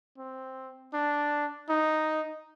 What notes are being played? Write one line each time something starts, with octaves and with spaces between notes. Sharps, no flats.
C4
D4
D#4